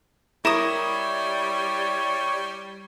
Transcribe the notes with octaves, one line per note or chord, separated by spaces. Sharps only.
G3 E4 A#4 C#5 D#6 E7